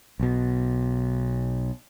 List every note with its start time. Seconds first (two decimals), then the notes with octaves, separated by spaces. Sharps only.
0.20 B1 B2